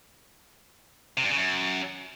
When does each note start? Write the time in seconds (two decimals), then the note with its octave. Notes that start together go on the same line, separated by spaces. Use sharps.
1.17 C3
1.24 G2
1.30 C#3
1.37 F#2